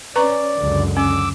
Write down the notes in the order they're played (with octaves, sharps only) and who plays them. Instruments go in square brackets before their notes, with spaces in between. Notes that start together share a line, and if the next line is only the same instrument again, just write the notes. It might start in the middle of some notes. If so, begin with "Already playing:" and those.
[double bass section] C#4 [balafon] B4 A#5 C#6 [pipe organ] D5
[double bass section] C#2 F#2 D3
[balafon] C#4 [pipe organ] D6 E6